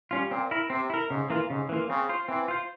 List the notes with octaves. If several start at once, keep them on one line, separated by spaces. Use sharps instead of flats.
G3 C#4 F4
A#2 C4
E4 A#4
C3 C4
E4 A#4
G#2 C#3
E3 A#3 F4
G#2 C#3
E3 A#3 F4
C#3 C4
F4 C5
E3 C4
F4 C5